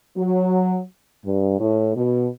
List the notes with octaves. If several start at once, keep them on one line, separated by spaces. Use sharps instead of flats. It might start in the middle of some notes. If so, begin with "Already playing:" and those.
F#3
G2
A2
B2